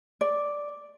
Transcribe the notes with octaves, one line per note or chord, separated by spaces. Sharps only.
D5